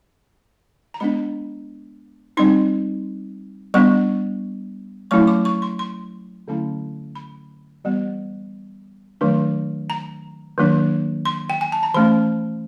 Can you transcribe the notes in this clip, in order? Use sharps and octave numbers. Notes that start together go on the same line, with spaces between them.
A#5
G#3 B3 D4 B5
G3 C4 D#4 C6
G3 B3 D4 C#6
F#3 A3 C#4 E4 C#6
D6
C#6
C6
C6
D3 F#3 A3 C#4 E4
B5
E3 G3 B3
D#3 F#3 A3 D4
A#5
D#3 F#3 A#3 D4
C6
G5
G#5
A5
A#5
E3 A3 C#4 B5